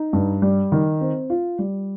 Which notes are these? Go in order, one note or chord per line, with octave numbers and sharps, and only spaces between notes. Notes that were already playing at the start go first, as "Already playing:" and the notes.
Already playing: D#4
G2
G3
D#3
C4
F4
G3